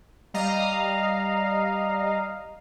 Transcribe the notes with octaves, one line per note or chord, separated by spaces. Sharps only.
G3 D#5 F5 A#5